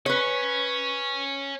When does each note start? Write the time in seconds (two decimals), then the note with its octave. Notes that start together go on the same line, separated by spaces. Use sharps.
0.06 C#4 B4 C#5